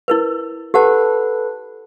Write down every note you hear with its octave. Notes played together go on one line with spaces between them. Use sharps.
E4 A#4 B4
G4 A4 B4 F#5 A5